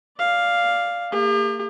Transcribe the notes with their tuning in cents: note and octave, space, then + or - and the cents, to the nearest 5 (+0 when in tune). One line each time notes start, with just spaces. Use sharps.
D5 +0 F5 +0
A#3 -45 G4 +45